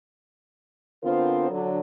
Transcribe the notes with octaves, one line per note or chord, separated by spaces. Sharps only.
D3 B3 C4 F4 A#4 C5
D3 F#3